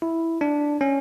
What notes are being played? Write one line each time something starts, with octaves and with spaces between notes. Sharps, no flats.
E4
D4
C#4